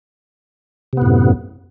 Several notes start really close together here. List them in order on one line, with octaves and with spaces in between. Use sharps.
C3 B3 A2 F#2